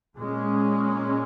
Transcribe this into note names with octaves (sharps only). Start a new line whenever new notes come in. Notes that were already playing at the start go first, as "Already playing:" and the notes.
A#2 G#3 C#4